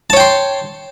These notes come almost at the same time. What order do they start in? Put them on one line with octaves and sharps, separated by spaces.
A5 C#5 G5 C6